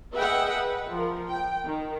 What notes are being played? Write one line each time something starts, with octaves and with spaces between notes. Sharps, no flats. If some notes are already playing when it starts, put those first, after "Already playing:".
G#4 B4 D#5 E5 F#5 G5
B4
F3 A#4
G5
D#3